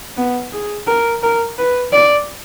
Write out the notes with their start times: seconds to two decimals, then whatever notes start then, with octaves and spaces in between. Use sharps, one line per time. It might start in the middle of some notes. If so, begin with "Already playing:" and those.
0.17 B3
0.52 G#4
0.87 A#4
1.23 A#4
1.58 B4
1.93 D5